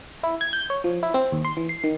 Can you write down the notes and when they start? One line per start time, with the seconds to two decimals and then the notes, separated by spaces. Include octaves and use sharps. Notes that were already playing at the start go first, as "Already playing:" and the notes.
0.23 E4
0.41 G#6
0.53 G6
0.70 C#5
0.84 F3
1.03 E4
1.14 C4
1.32 D#2
1.45 C6
1.57 E3
1.69 C7
1.84 D#3